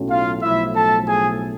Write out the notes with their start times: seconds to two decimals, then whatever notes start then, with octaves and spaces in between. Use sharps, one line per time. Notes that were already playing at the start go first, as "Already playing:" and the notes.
Already playing: B1 A2 F#3 C#4
0.10 F4 F5
0.42 B1 A2 F3 A3 E4 E5
0.75 A4 A5
1.07 G#4 G#5